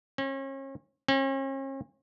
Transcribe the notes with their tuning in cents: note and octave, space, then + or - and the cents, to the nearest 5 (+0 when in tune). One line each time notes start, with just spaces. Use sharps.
C#4 -40
C#4 -45